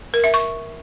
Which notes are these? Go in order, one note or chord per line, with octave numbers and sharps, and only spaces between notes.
A#4
E5
C#6